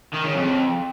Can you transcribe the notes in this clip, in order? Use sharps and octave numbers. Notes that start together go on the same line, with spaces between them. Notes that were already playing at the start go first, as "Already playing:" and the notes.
D#3
C#3
F2